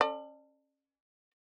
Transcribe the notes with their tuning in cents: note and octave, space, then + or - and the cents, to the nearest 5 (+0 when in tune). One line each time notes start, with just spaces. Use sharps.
C#4 -20 A4 +25 D5 +40